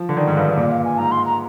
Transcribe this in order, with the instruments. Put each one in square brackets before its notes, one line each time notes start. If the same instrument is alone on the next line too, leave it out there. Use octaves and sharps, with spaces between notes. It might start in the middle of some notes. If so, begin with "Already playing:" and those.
Already playing: [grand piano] F3
D3
[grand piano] D#3 [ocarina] D5
[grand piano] G#2
G2
G2
[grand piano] A#2 [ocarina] D5
[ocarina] F5
G#5
[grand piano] G#2 [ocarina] A#5
[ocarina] C6
A#5